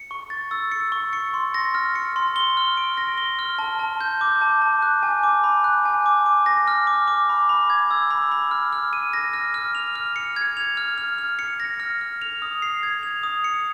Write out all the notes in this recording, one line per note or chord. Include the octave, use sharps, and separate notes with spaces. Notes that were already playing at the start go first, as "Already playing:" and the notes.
Already playing: C#7
C#6
A6
E6
C#7
C#6
C#7
C6
A#6
F6
C#7
C6
G7
F6
D7
A#6
G7
F6
A5
A5
G6
D6
A5
A5
F#6
G#5
D6
B5
F#6
G#5
D6
D6
A#6
F6
D6
D6
B5
B5
G#6
E6
B5
B5
F6
F6
D#7
A#6
F6
F6
F7
F6
C#7
G#6
F7
F6
F6
F6
C#7
A#6
F6
F6
F7
D#6
C7
G#6
F7
D#6
C#7